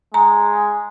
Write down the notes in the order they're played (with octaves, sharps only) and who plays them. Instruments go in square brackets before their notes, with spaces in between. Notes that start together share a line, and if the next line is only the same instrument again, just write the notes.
[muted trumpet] G#3 [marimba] A#5